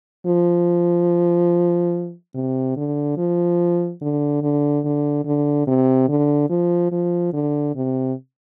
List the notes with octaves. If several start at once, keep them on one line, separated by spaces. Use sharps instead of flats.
F3
C3
D3
F3
D3
D3
D3
D3
C3
D3
F3
F3
D3
C3